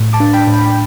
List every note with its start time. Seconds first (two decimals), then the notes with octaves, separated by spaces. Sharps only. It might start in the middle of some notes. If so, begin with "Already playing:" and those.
Already playing: A2
0.13 A5 D6
0.20 D4
0.33 G5 B5
0.47 A2
0.53 G5 B5